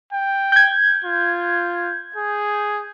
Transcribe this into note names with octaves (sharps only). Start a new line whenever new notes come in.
G5
G6 G#6
F4
G#4